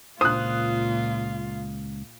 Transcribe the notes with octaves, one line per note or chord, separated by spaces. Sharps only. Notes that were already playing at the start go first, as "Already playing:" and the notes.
C#2 A#2 F4 C5 D#6 F#6